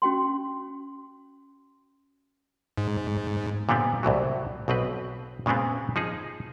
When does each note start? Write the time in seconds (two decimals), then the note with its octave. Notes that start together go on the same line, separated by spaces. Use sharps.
0.02 C#4 F#4 G5 C6
2.78 G#2
3.69 A#2 D3 G3 B3 C4
4.03 C2 A2 E3 F#3
4.68 B1 B2 C4 B4
5.46 A#2 C#3 G#3 B3 C4
5.96 F3 D#4 G#4